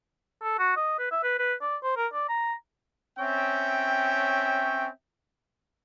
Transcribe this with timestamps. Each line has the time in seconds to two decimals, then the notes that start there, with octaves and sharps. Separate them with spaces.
0.42 A4
0.59 F#4
0.77 D#5
0.99 B4
1.11 E5
1.23 B4
1.39 B4
1.62 D5
1.83 C5
1.97 A#4
2.13 D5
2.29 A#5
3.19 C4 C#4 C#5 E5 G5